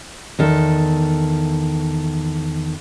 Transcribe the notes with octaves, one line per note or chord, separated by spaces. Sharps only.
E2 D#3 A4